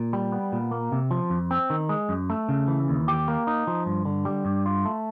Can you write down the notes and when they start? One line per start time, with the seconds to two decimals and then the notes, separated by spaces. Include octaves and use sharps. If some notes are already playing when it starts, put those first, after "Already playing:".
Already playing: A#2
0.13 G3
0.32 B3
0.52 A#2
0.71 A#3
0.92 C3
1.11 F3
1.30 F2
1.51 C4
1.70 D#3
1.89 G#3
2.09 F#2
2.30 A3
2.49 C#3
2.68 E3
2.88 D#2
3.08 G4
3.28 A#3
3.47 D#4
3.67 F3
3.86 G2
4.05 D3
4.25 G3
4.45 G2
4.66 F4
4.85 A3